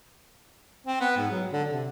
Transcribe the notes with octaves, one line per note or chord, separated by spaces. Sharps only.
C4
B3
G#2
F#3
D3
C3